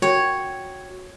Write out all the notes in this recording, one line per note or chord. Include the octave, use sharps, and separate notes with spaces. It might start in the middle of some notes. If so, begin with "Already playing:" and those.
F#4 C#5 G5